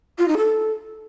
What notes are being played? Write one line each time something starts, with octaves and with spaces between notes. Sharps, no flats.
F4
D#4
A4